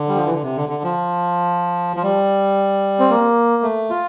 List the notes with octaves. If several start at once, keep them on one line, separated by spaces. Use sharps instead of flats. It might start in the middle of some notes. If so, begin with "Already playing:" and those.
Already playing: D3
G3
F3
E3
D3
C3
D3
D3
F3
F3
G3
C4
A#3
A3
F4